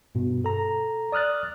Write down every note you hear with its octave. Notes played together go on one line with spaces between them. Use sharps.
G2 B2
A4 A#5
D5 D#6 F6 F#6 A6